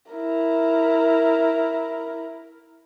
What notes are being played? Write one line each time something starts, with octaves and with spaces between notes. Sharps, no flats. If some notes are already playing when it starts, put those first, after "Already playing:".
E4 A#4